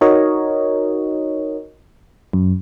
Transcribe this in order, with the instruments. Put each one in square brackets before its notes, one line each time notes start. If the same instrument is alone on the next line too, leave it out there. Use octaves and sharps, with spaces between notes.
[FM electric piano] D#4 F#4 A#4 C#5 D#5
F#2